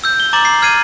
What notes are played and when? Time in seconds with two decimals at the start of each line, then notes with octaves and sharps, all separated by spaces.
0.04 E6 G6
0.20 G7
0.33 A#5 D6 A6 F#7
0.45 C7
0.62 F6 G#6 C7 D#7